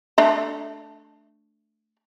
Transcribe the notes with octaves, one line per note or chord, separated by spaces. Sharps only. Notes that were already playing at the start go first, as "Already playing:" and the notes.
A3 D4 E5